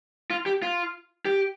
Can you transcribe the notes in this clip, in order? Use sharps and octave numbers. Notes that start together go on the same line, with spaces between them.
F4
G4
F4
G4